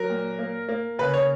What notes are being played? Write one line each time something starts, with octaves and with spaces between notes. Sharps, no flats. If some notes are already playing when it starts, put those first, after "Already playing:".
Already playing: F#3 A#4
A#2
A#3
A#3
C#3 B4
C#5